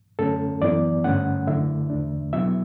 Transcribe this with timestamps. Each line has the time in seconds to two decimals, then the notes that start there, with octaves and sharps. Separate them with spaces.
0.19 F#2 D3 A3 C#4 A4
0.62 F#2 E3 B3 E4 D5
1.04 G2 D3 A3 C#4 F#5
1.47 F#2 D3 A3 E4 E5
1.90 E2 D3 A3 D4
2.33 B2 F#3 B3 E4 E5